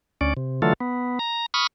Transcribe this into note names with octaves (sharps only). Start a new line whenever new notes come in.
D2 C#4 D5
C3
D3 E3 F#3 A3 F4 A4
B3
A#5
B5 C#6 D#6 F6